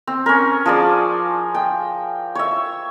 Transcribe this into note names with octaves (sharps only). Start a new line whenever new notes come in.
C4
C#4 A#4
F3 G#4 D5
G5
C#5 E5